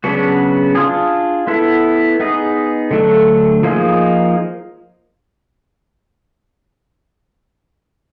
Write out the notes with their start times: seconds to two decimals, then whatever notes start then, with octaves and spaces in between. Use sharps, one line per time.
0.04 C#3 F#3 B3 D4 F#4
0.75 D4 F4 G#4
1.47 B3 E4 A4
2.20 B3 D#4 G#4
2.91 D3 F#3 A3 D4
3.63 F3 A#3 D#4 G#4